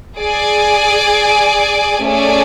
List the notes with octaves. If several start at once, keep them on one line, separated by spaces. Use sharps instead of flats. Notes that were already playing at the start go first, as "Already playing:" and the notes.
G#4 D5 G#5
A3 C#4 G#4 D5